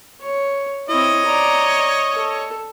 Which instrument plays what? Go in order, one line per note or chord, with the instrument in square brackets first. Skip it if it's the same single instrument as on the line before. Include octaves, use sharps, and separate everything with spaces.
[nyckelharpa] C#5
[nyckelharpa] C4 E4 [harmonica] C#5 D#5
[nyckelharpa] D5 A#5
A4